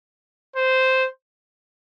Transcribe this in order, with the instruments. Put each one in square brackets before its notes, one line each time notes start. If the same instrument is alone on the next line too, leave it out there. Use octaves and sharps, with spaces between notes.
[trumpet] C5